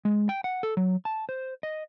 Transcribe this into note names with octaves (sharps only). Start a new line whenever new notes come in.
G#3
G5
F#5
A4
F#3
A5
C5
D#5